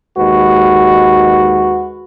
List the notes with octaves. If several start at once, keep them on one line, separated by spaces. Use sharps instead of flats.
D#2 G#3 F#4 B4